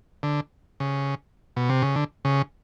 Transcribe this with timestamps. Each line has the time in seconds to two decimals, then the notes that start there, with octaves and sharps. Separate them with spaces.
0.23 D3
0.80 C#3
1.56 B2
1.70 C3
1.82 C#3
1.96 D3
2.25 C#3